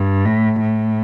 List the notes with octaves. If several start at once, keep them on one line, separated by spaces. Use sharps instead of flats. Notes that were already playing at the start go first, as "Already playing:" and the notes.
Already playing: G2
A2
A2